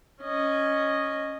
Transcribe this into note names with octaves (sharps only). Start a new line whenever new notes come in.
C#4 D#5